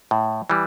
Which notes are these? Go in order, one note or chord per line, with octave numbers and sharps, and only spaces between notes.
A2
E3 G3